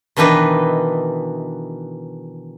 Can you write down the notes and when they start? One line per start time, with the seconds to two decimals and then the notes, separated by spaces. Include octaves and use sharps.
0.17 B2 D#3 E3 D4 B4 D#5